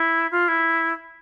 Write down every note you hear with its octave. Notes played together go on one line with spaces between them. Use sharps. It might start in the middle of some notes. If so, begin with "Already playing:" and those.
Already playing: E4
F4
E4